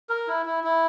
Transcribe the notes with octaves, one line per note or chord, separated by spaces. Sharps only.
A#4
E4
E4
E4